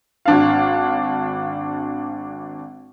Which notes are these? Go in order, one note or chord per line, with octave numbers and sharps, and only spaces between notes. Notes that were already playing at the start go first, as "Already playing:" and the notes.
G#1 D4 F5